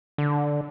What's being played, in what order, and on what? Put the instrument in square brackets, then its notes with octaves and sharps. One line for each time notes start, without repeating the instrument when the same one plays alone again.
[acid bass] D3